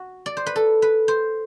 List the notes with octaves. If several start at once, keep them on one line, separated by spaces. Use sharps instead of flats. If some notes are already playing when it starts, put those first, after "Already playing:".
Already playing: F#4
D5
C5
B4
A4
B4
C5